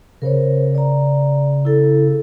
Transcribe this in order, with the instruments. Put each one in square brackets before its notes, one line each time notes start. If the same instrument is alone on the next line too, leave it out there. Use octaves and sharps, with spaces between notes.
[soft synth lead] C#3 [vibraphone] A#4 C5 C#5
[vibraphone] D5 A#5
E4 A4